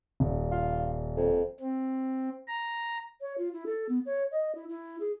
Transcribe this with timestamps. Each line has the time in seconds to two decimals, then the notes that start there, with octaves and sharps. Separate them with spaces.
0.20 D#1
0.52 F4
1.17 F2
1.60 C4
2.47 A#5
3.21 C#5
3.38 F4
3.53 E4
3.66 A4
3.89 B3
4.06 C#5
4.31 D#5
4.55 E4
4.69 E4
5.00 G#4